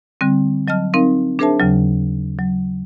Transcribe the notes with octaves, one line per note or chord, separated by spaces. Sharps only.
D3 G3 C4
F#3 D#5 A5 F6
C4 D#4 A#4 F5
D4 G#4 A#4 C5 E5 A5
D#2 C#3 F#3
F#3